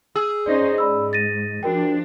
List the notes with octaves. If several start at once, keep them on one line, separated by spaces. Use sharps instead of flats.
G#4 E6
C#4 D#4 C5 D5
G#2 D5 B5 E6
A6 A#6 D#7
F3 D4 F#4 A#4 G5